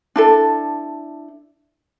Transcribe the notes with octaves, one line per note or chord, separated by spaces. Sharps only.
D4 E4 A4